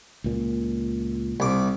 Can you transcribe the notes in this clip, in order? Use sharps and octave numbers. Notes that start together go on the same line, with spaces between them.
C#2 A#2
C2 D6